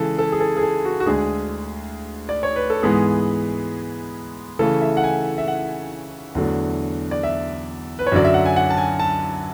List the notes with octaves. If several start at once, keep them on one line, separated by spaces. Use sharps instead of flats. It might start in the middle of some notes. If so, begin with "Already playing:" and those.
Already playing: C#3 E3 G#3 A4
A4
G#4
A4
G#4
A4
F#4
F#4
D2 D3 G#3 D4 G#4
D5
C#5
B4
A4
G#2 E3 G#3 B3 G#4
C#3 E3 A3 A4
E5
F#5
G#5
E5
F#5
E2 D3 F#3 A3 D4
D5
E5
B4
C#5
F#2 D3 F#3 D5
E5
F#5
G#5
F#5
A5
G#5
A5